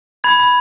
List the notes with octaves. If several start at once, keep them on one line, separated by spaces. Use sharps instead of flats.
B5 G#6
B5